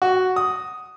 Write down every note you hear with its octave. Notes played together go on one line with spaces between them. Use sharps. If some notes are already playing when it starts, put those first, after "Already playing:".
F#4
D#6